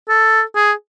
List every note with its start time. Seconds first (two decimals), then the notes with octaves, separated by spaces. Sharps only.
0.09 A4
0.55 G#4